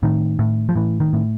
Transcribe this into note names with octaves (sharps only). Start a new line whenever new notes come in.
A2 D#3
A2
F3
A2 E3
D#3
A2